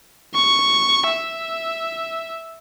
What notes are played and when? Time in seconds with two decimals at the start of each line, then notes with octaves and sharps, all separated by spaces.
0.34 C#6
1.07 E5